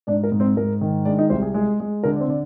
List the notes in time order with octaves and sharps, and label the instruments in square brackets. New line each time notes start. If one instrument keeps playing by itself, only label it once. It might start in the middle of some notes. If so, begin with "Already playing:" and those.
[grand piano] G#2 D4 D5
A#4
G#2
C4 C5
G#2 A#4
D#3
G#3 D4 D5
D#4 D#5
C2 C4 C5
G#4
G#3 G#4
G#3
D3 A#4
D5
C4 C5
D3 D5